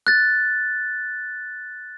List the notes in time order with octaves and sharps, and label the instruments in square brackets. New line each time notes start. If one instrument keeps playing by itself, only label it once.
[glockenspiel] F#6 A6